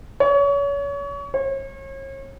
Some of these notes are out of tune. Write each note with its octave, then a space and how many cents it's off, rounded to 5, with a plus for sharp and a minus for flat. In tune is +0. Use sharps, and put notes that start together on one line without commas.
C#5 +30
C#5 -40